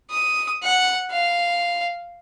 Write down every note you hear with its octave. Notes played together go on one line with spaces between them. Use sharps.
D#6
F#5
F5